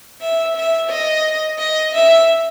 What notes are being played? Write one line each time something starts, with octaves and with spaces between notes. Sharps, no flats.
E5
E5
D#5
D#5
E5